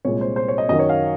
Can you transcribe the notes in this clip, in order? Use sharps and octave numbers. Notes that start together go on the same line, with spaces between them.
C2 A#2 G#3 C#5
C5
C5
C#5
D#5
F#2 D#3 F#3 D#5
C#5
F5